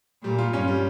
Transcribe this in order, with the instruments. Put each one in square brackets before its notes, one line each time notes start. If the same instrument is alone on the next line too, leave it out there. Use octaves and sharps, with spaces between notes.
[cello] A#2 [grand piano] G3
[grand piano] F4
[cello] G2 [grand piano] C#4
[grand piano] G3